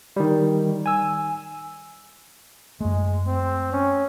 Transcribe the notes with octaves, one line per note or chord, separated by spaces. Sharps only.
D#3 G3
G#5 E6
F#2 G#3 A3
C4
C#4